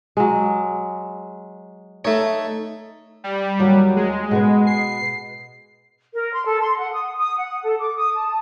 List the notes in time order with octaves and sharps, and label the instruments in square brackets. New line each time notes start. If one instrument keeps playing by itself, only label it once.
[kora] F#3 G#3
[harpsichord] A3 C#5 [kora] D#4
[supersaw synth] G3
[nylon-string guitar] D#2 F#3
[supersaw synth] G#3
[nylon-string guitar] B2 G#4 B4
[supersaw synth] C7
[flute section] A#4
C6
A4
C6
F#5
D#6
D#6
F#5
A4
D6
D#6
A5